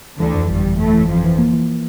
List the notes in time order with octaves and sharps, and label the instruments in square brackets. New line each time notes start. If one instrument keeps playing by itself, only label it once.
[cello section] D2 D3 [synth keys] E3
[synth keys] F2
[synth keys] G1 [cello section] G2 G3
[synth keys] G1
[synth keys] G1 [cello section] A2 A3
[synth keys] E3
[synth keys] G1 [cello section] F2 F3
[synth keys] E3
A#3
E3